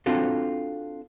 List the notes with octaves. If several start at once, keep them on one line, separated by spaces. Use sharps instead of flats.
C4 D4 F4 F#4 A4